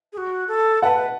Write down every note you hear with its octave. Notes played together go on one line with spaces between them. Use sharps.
G#4
F#4
A4
B4 F#5 A5